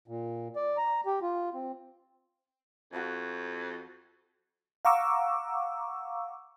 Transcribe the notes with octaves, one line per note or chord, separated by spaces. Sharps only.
A#2
D5
A#5
G4
F4
C4
F2 F#4 F5 A5
F5 F#5 A#5 C#6 D6 E6